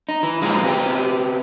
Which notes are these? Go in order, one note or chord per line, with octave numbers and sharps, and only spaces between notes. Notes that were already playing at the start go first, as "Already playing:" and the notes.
D#4
E3
F2 A#2 E3 G#3 D#4 F4
C3 B3 G4